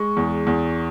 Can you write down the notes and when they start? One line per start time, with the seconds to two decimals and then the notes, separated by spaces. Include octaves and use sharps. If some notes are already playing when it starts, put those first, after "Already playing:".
Already playing: G#3 C#6
0.17 E2
0.47 E2